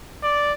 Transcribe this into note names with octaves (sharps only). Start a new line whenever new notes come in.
D5